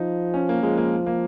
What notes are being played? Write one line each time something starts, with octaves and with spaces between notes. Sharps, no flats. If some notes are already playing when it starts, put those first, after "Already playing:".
Already playing: F3 D#4
C#4
A#3
F3 G#3
A#3
A#3